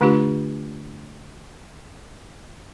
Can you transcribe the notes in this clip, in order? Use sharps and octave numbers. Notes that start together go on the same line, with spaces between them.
D3 A3 D4 F4 G4